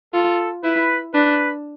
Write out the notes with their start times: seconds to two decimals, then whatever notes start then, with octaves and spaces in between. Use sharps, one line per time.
0.13 F4 A4
0.63 E4 B4
1.14 D4 B4